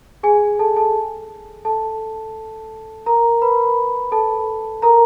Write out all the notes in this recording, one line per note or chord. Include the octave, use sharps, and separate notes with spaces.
G#4 G#5
A4 A5
A4 A5
A4 A5
A#4 A#5
B4 B5
A4 A5
A#4 A#5